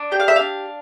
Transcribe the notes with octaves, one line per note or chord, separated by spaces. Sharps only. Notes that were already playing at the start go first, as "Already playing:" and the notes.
Already playing: D4
G4 G5
F5
E5
D4 F5